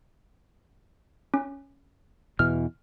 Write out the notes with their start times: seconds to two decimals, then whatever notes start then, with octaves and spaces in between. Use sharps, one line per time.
1.34 C#4
2.39 E2 B2 E3 F6